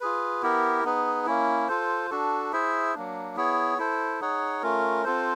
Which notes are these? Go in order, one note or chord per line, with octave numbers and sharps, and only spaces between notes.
F4 G#4 B4
B3 E4 G4 A#4
B3 D#4 G#4 B4
A#3 C#4 E4
F4 A4 C5
D4 F#4 A4
E4 G#4 C5 E5
F#3 A#3 D4
B3 E4 G#4 C#5
E4 A4 C5
D#4 G#4 C#5 F#5
A3 C#4 F4 A#4
C4 F4 A4 C5